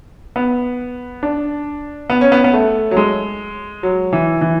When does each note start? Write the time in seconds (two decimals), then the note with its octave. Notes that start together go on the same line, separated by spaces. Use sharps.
0.36 B3
1.23 D4
2.10 B3
2.21 C#4
2.32 B3
2.44 B3
2.53 A3
2.91 F#3
2.97 G#3
3.83 F#3
4.13 E3
4.41 E3